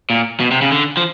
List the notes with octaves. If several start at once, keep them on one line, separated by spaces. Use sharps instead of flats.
A#2
B2
C3
C#3
D3
F3